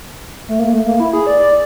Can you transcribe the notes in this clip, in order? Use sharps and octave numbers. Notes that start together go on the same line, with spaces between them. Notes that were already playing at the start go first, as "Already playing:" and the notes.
A3
A#3
A3
A#3
E4
G#4
D5
D5